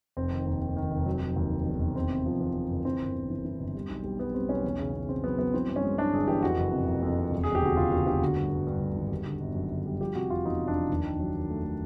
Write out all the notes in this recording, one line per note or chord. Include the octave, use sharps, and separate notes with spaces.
F1 C4
D#3
D#2
D#3
D#3
F1
F#3
F#3
D#2
D#3
E1
D#3
E2 C4
C3
F3
E2
C3
F#1
E3 C4
G1
G1
E3
E3
G1
G3
B1
G3
G3 B3
G3 C4
B1 C#4
E2
C#3
C#3
C#3 C4
F#3 B3
F#3 B3
E3 C4
G2
C#4
G#3
G#3 D4
G1 G#4
E3 G4
F2 F#4
F#1
C3
F#1
F2
C3
E1
E1 G#4
G4
D2 F#4
C#3 F4
D2 F#4
D2 G4
D3 F#4
G2
G2
G2
D3
G#1
G3
D3
G1
F#2
D3
G3
F3 G4
C3 F#4
F1 F4
E2 D#4
F1
D4
F3
D#2
D#3
F#3
D#3
A3
A3